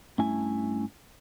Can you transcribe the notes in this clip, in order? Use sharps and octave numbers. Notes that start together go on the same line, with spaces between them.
G2 A3 C#4 E4 G#5